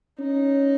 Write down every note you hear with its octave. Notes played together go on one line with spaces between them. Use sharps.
C#4 D#4